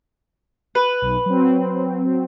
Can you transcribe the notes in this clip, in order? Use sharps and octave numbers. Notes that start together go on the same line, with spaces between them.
B4
B1
F#3 C4